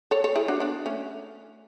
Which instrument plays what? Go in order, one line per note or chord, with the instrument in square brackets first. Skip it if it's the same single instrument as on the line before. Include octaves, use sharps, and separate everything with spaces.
[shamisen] A4 C#5
A4 C#5
E4 G#4
D4 F#4
B3 D4
A3 C#4